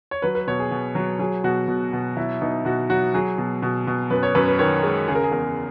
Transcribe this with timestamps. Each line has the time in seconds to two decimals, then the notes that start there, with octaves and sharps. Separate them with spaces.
0.11 C#5
0.22 F#3 B4
0.35 B4
0.47 B2 C#5
0.59 G#4
0.71 B2
0.95 F#3
1.19 F#3 G#4
1.44 B2 F#4
1.68 B2
1.93 B2
2.17 F#3 E4
2.41 B2 D#4
2.65 B2 F#4
2.90 F#3 F#4
3.14 F#3 G#4
3.38 B2
3.62 B2
3.87 B2
4.10 F#2 B4
4.23 C#5
4.35 F#2 B4
4.48 B4
4.59 D#3 C#5
4.83 G#3
5.08 C#3 G#4
5.15 A#4
5.24 G#4
5.32 E2 A#4